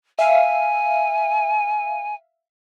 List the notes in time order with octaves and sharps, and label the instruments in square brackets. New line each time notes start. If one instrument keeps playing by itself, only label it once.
[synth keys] E5 F5 [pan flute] G#5